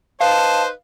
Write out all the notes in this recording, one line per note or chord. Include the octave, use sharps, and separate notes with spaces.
D#4 B4 C5 D#5 F5 A5